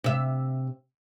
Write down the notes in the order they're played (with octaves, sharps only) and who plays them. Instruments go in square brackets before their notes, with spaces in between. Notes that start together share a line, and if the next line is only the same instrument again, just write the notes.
[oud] C3 E5